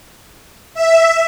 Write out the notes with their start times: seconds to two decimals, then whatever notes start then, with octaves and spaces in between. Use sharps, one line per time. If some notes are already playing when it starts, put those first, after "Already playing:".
0.74 E5